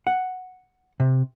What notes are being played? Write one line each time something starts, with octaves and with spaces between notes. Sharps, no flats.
F#5
C3